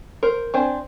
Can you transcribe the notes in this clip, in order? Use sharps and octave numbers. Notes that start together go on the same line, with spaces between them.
A#4 C5
C4 D4 C5 G#5